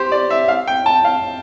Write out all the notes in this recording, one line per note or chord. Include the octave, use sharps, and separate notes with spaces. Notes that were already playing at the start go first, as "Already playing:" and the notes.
Already playing: G4 C5
D5
E5
F5
G5
A5
F5